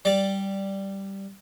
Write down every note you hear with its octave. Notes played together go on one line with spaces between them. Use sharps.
G3 D5